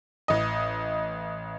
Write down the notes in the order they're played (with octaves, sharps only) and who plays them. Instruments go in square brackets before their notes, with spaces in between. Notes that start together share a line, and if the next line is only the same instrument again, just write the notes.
[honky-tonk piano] A1 D#5